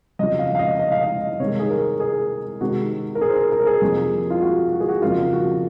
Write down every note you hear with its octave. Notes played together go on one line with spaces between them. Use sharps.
F2 C#3 F#3 D#5
F5
F5
D#5
D#5
F5
D#5
C3 D#3 G#3 C#5
G#4
A#4
G#4
C3 D#3 G#3 F#4
A#4
G#4
C5
A#4
A#4
G#4
F2 C3 F#3 A#3
F4
F#4
F#4
G#4
F#4
F2 C#3 F#3 A#3 F4
F#4